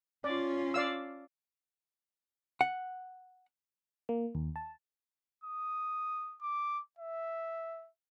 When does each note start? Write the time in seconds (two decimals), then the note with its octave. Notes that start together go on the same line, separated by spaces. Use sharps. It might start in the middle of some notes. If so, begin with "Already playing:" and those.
0.24 C#4 F4 D5
0.74 D5 F5 E6
2.61 F#5
4.09 A#3
4.35 D#2
4.56 A5
5.44 D#6
6.42 D6
6.99 E5